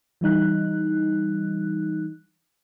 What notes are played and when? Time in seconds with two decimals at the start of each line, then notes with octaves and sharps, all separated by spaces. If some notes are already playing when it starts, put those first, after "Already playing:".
0.21 E3 G3 D#4 F#6